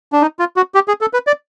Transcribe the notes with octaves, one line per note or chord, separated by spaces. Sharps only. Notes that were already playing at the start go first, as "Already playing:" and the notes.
D4
D#4
F4
F#4
G4
G#4
A4
B4
D5